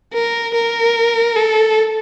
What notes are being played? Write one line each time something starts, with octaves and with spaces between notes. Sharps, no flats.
A#4
A#4
A4